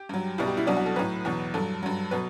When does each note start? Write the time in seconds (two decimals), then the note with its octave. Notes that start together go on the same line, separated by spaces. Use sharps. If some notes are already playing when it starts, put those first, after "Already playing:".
Already playing: G4
0.09 G2 F#3
0.38 C2 B2 G3 E4
0.47 G4
0.57 E4
0.67 C2 B2 F#3 D4
0.77 F#4
0.86 A4
0.96 A2 F#3 B4
1.25 E2 B2 F#3
1.54 G2 F#3 A4
1.83 G2 F#3
2.11 B2 F#3 B4